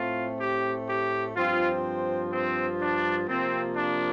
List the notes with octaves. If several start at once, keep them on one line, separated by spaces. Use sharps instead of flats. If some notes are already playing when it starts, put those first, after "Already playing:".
Already playing: A2 A3 C4 F4
G4
G4
G2 F3 C4 F4
C4
D4
C3 F3 A#3 C4
D4